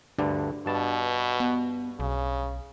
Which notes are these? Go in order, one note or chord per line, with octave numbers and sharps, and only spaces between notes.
D2 G2 D3 D4
G2 B2 A5
B3
B1 C#3